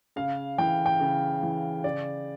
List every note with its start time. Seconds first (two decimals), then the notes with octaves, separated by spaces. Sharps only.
0.16 C#3 F5
0.58 E3 G5
0.86 G5
1.00 C#3
1.43 E3
1.84 C#3 D5